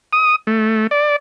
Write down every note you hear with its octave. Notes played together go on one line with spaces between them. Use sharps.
D#6
A3
D5